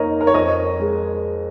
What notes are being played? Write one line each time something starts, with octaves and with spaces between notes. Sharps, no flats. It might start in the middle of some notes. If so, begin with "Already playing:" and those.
Already playing: F2 A#3 D#4 A#4 C#5 D#5
A#4
C#5
F2 A#4 D#5
G#3